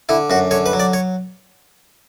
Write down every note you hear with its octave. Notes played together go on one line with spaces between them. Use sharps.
D3 E4
F#2 F#4
D3 C#5
B4
F#3
D5
C#5